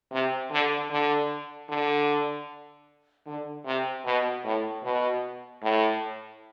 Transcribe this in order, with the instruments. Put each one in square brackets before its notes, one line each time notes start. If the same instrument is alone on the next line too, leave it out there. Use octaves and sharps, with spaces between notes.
[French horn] C3
D3
D3
D3
D3
C3
B2
A2
B2
A2